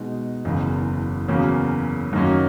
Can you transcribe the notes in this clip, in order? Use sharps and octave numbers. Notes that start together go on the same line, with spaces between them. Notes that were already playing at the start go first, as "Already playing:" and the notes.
Already playing: B2 G#3 D#4
F#1 E2 C#3
E2 C#3 F#3 A#3 C#4
F#2 D#3 F#3 A#3 C#4